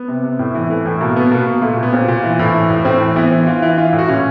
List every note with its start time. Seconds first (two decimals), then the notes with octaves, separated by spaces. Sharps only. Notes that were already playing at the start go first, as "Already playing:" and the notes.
Already playing: B3
0.08 C3
0.23 C3
0.39 A2
0.54 E3
0.70 E3 A3
0.86 A2
1.01 B2 A#3
1.16 B2 B3
1.31 B2 A#3
1.47 B2
1.62 A#2 A3
1.77 A#2
1.83 B3
1.93 A#2 C4
2.08 A#2
2.24 E3
2.39 A2
2.55 E3
2.70 A2
2.85 A2 C4
3.01 E3
3.16 E3 B3
3.32 E3
3.47 E3 F4
3.62 E3
3.78 E3 F4
3.93 A2
3.99 F#4
4.08 A#2 C#4